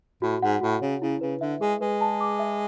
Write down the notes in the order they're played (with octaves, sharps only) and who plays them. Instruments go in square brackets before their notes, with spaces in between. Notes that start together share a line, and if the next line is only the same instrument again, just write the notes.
[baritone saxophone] A2 [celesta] F#4
[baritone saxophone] G#2 [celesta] F#5
[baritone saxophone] A2 [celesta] F#4
[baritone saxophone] C#3 [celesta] C#5
[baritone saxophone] C#3 [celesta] E4
[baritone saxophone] C#3 [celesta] B4
[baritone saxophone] D3 [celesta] E5
[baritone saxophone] G#3 [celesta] G#4
[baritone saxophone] G#3 [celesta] B4
[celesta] A5
D6
E5